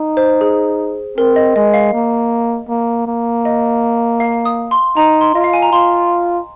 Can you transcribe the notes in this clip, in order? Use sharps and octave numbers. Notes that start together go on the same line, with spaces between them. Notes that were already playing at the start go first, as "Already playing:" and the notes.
Already playing: D#4
C5
G#4
C4 A#4
D#5
G#3 D#5
F5
A#3
A#3
A#3
D#5
F5
D#6
C6
D#4 A#5
C6
F4 D#5
F5
G#5
A#5
F4 C6